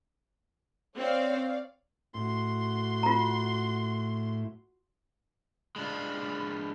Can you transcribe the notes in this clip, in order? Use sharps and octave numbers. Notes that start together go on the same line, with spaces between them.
C4 C#5 D5 F5
A2 F#4 C6
F4 A#5
G#3 D4 F4 B5